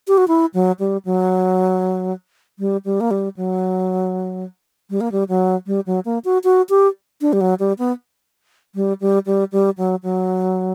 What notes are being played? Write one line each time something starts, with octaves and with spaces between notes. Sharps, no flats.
G4
F#4
E4
F#3
G3
F#3
G3
G3
A#3
G3
F#3
G3
A#3
G3
F#3
G3
F#3
A#3
F#4
F#4
G4
D4
G3
F#3
G3
B3
G3
G3
G3
G3
F#3
F#3